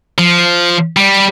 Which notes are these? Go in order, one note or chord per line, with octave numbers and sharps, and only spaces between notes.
F3
G3